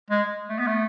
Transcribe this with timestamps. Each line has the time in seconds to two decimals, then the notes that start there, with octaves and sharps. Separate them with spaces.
0.10 G#3
0.49 A3
0.58 B3
0.67 A3